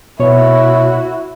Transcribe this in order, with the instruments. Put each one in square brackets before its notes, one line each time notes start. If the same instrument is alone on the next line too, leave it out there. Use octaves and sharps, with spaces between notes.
[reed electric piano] B2 C#5 [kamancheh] E4 F#4